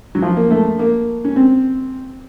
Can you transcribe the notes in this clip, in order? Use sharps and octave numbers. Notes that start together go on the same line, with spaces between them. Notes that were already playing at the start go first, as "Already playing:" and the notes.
F#3
F3
A#3
A3
A#3
C#4
C4